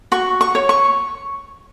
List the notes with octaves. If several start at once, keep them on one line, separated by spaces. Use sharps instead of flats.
F#4 C#6
C#6
C#5
C#6